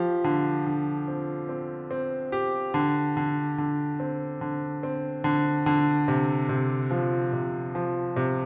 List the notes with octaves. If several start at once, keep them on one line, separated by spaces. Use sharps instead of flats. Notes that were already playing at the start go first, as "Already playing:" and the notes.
Already playing: F3 G4
D3
D3
C4
C4
C4
G4
D3
D3
D3
C4
D3
C4
D3
D3
C3
C3
F3
C3
F3
C3